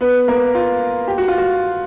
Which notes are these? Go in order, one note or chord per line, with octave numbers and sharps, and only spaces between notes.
B3 B4
A#3 A#4
F4
G4
F#4
F4
F#4